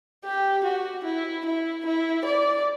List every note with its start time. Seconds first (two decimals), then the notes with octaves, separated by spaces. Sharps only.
0.25 G4
0.64 F#4
1.05 E4
1.45 E4
1.86 E4
2.25 D5